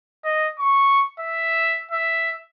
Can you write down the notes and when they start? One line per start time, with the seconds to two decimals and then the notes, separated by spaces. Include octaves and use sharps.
0.24 D#5
0.60 C#6
1.20 E5
1.91 E5